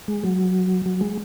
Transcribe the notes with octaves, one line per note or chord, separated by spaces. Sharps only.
G#3
F#3
F#3
G#3